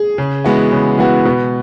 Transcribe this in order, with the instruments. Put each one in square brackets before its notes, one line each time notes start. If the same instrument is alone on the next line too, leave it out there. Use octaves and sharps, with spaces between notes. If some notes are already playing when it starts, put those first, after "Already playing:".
Already playing: [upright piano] G#4
[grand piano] C#3
E3 G#3 B3 F#4
C#3
E3 G#3 B3 F#4
[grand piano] B2 [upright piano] B4